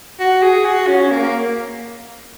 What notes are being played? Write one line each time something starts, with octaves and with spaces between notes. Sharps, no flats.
F#4
G#4
F#4
C#4
C#4
A#3